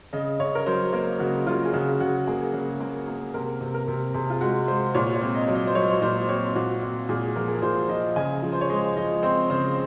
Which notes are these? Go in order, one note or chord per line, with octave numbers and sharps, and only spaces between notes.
C#3 D#5
C#3 C#5
A#4
F#3 C5
A#3 A#4
C#3 F#4
F#3 F4
G#4
C#3 F#4
C#3 F#4
A#3 G#4
C#3
A#3
A#3
C3 A#4
C3
A#4
C3
C3 G#4
F4
G#3 F#4
G#3 C5
A#2 C#5
C#5
C4
D#5
F#3
D#5
C5
F#3 C#5
C#5
A#2 C5
C4 C#5
A#2 F#4
C4 F#4
A#2 G#4
F3 A#4
G#4
A#4
A#2 C5
F3 D#5
C#3 G#5
F3
C5
C#5
G#3 D#5
F3 D#5
C4 C5
C#3 C5